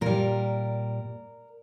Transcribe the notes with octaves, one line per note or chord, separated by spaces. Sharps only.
A#2 G3 A#4